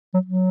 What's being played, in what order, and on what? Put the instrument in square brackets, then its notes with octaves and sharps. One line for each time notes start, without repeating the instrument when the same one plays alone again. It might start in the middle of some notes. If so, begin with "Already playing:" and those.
[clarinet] F#3
F#3